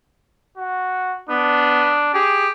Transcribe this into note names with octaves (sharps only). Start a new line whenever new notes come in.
F#4
B3 D4
G4 G#4